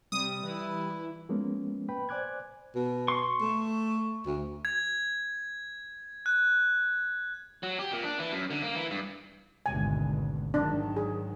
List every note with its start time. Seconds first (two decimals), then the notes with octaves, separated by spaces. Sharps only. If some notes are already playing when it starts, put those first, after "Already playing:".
0.12 C3 G3 D#6
0.43 E3 E4 B4
1.29 F3 G#3 A#3 B3 C#4
1.89 B4 G5 B5
2.09 C5 D5 G#5 D6 F#6 G#6
2.75 B2
3.08 C6 C#6
3.41 A3
4.26 D2
4.65 G#6
6.26 F#6
7.63 F#3
7.79 G4
7.93 A#2
8.04 D4
8.19 E3
8.32 F#2
8.50 D3
8.63 A#3
8.75 E3
8.91 G2
9.66 G#1 D2 B2 G#5
10.54 G#2 D#3 F#3 D4
10.96 G#4